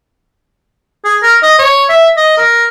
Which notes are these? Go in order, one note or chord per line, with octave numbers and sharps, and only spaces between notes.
G#4
A#4
D#5
C#5
E5
D#5
A#4